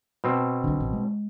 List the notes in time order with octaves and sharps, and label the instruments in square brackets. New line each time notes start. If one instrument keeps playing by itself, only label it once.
[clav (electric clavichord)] B2 C4
[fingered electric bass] B1 D3
A1
G#3